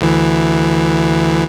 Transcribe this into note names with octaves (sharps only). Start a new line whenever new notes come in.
D2 E3